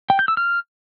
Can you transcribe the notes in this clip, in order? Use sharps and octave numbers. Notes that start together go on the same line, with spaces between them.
G5
G6
E6
F6